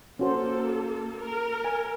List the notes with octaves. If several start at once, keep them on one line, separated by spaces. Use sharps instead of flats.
A#3 C#4 F#4 A4 C5
A#4
G#5